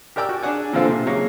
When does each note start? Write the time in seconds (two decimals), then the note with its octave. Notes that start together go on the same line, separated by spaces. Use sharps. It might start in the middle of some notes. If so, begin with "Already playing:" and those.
0.16 G4 A#4 D5 G5 D6 E6
0.29 F#4
0.43 D4 G#4 D5 F#5 G#5
0.73 A#2 D3 E3 C4 F4 A4
0.85 C3 A#3
1.06 C#3 F#3 G#3 A#3 C#5